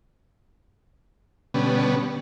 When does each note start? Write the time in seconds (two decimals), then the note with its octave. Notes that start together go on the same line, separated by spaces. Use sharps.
1.54 B2 D3 G3 B3 C#4